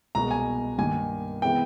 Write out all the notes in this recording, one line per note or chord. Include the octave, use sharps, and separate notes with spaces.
C2 B2 G#3 A#5
G#5
G2 D#3 G3 A#3 G#5
C3 E3 G#3 B3 G5